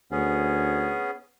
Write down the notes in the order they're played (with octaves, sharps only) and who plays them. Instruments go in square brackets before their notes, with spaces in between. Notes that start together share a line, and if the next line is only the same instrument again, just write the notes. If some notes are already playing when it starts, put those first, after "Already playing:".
[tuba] D2 [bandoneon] B3 C#4 G#4